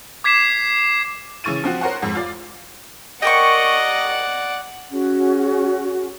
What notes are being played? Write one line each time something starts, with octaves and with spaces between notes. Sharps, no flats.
D6 G#6 B6 C7 E7
C#3 E3 C#6 A6 D#7
F3 C4 F#4
A#4 C5 C#5 F#5
F2 G#2
F4 D5
G4 A#4 D5 D#5 F#5 C#6
C#4 F#4 G#4